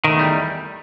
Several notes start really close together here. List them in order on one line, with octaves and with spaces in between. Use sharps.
D#3 A3 E2 G3